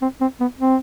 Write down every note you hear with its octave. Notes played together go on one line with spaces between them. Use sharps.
C4
C4
B3
C4